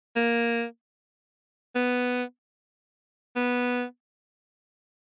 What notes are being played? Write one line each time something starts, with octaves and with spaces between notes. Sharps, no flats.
A#3
B3
B3